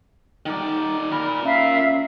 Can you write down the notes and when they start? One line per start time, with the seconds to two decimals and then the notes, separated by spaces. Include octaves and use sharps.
0.46 D#3 D#4 D5
1.12 A#2 A#4 B5
1.44 C#4 E5 F5